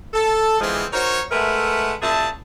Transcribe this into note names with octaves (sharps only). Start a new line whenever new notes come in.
A4
D3 E3 F3 G#3 B3 C4
D#4 F#4 A#4 C5 C#5
G#3 A3 A#4 B4 E5 F#5
F#2 A#2 G#4 E5 A5